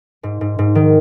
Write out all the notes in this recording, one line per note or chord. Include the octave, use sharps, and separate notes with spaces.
G#2
G#2
G#2
D#3